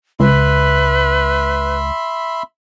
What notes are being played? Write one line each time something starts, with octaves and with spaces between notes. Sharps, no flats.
C#2 B4 E5 B5 C6